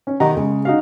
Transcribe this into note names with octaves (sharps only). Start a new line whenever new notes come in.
C#4
B2 D#3 G4 D#5 F#5 A#5
C#3 G#3
D#4 F#4 F5